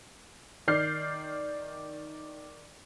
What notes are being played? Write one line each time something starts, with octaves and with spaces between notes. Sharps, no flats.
D#3 D5 F6 G6 C7